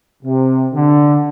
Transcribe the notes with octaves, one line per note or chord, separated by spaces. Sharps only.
C3
D3